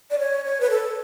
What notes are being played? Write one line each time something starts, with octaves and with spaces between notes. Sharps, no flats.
D5
C#5
C#5
B4
A4